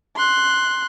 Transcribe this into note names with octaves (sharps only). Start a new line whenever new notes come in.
C6 F#6